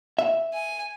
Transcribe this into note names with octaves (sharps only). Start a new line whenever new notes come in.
E5
G#5